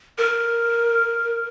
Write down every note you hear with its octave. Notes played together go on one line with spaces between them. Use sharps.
A#4